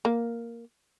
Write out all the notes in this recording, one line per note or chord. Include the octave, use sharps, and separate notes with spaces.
A#3